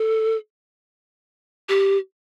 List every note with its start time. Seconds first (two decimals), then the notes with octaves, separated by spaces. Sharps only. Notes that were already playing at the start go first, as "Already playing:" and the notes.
Already playing: A4
1.69 G4